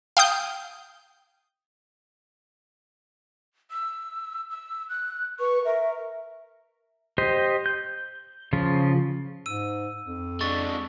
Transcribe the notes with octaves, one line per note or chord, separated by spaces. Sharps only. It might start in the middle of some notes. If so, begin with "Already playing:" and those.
F5 G5 D#6 G6
E6
E6
F#6
B4 C#6
A#4 E5
G4 C5 D#5
G6
C#3 F3 F4
G#2 E6 D#7
F2
G#3 D4 C#6 A6